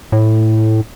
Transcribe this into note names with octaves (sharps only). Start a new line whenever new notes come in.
A2